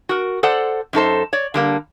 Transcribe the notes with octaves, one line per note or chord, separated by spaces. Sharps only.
F#4 A#4
A4 C5 D5 F#5
F#2 D#4 A4 C5
C#5 D5
D3 G3 A#3